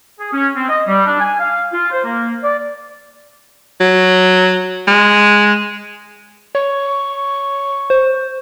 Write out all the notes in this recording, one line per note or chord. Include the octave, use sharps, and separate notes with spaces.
G#4
C#4
C4
D#5
G3
D4
G#5
F5
F4
C5
A#3
D5
F#3
G#3
C#5 C#6
C5